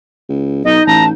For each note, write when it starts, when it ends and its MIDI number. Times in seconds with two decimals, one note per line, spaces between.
0.29 0.60 37
0.65 0.80 35
0.65 1.13 63
0.65 0.85 75
0.87 1.11 33
0.87 1.07 81
0.87 1.04 82